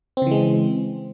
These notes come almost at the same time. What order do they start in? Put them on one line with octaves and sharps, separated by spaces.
C4 C#3 E3 G#3